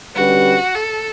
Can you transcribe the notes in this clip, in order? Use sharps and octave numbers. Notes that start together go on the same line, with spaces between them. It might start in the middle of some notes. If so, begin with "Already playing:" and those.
D3 G3 C#4 F#4 G4 B4
A4